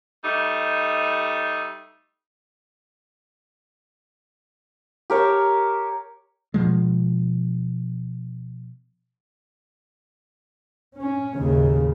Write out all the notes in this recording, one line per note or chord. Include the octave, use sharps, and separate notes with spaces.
G3 A3 D#4
G4 A#4 C#5 A5
B2 F3 G#3
C#4
D#2 A2 C#3